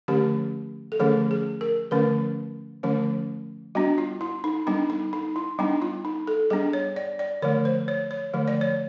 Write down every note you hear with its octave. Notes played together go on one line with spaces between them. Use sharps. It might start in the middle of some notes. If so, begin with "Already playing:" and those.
D3 F3 A3 C#4 G4
A4
D3 F3 A3 C#4 G#4
G#4
A#4
D3 F3 A3 C#4 B4
D3 F3 A3 C#4
G3 B3 D4 F#4
F4
E4
D#4
G3 B3 D4 D#4
D#4
D#4
E4
G3 B3 D4 D#4
F4
D#4
A4
G3 B3 D4 G#4
C#5
D5
D5
D3 F3 A3 C#5
C5
C#5
C#5
D3 F3 A3
D5
C#5